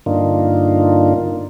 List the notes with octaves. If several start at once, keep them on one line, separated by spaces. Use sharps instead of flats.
G2 D3 A#3 D4 D#4 F4